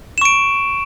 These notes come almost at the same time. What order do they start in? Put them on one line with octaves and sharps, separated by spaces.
E7 C#6 D7